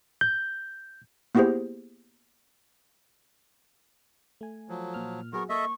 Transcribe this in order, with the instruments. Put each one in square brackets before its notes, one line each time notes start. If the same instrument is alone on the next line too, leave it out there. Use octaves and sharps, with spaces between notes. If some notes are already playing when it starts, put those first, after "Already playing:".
[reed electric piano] G6
[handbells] A#3 B3 E4 G4 G#4 C5
[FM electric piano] A3 G#5
[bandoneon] F3 F#3
[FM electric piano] A#2 F6
[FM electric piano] F#3 F#4 G#4 [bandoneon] B3 A#4 [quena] C#6
[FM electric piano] A#3 [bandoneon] A4 D#5 E5 [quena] C#6